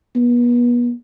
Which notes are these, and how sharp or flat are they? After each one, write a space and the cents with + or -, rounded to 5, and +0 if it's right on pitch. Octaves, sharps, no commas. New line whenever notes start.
B3 -35